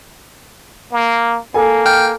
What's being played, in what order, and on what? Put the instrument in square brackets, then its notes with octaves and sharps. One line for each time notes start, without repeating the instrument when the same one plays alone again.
[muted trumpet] A#3
[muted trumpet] A#3 [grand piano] A4 G#5
[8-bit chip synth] G5 F6 G6